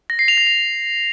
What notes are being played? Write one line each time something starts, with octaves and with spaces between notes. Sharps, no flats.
A#6
C7
F7
A#6
F7